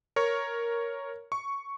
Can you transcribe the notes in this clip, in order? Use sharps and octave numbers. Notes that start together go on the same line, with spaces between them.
A#4 C#5 C#6
C#6